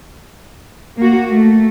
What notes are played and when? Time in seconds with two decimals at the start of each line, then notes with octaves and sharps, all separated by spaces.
0.98 A#3 F#4
1.29 A3